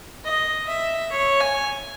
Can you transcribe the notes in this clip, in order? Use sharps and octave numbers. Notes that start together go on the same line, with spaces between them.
D#5
E5
C#5
G#5